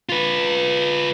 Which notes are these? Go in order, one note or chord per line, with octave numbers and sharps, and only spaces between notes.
F4 B4